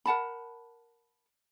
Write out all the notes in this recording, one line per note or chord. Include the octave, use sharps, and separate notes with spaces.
A#4 F#5 A5 B5